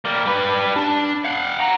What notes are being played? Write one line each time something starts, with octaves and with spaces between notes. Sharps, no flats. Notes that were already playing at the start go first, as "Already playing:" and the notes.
G3 A#3
G3 B4
D4 A5
F5 F#5
F#5 A#5